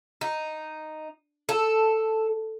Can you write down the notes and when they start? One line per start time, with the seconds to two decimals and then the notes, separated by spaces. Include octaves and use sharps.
0.21 D#4
1.49 A4